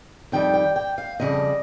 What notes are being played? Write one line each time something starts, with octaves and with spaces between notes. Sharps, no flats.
F2 D#3 G3 G5
G5
G5
F5
F2 C#3 G3 D#5